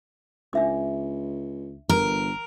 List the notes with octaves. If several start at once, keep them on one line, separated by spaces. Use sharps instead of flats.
C#2 D4 E5 D6
G1 A#4